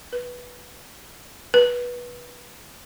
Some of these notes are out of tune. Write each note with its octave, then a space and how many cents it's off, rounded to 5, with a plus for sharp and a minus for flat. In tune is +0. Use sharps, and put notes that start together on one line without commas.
B4 -10
B4 -20